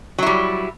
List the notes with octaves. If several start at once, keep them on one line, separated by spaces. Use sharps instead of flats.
F#3 G3 E4